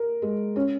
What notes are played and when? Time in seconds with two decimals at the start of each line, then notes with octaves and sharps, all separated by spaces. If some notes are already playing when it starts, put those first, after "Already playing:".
Already playing: A#4
0.22 G#3
0.56 C#4